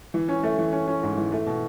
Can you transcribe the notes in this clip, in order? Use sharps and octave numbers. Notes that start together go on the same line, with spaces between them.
E3
C#4
A3
E3
C#4
C#4
G#2
E3
A3
B2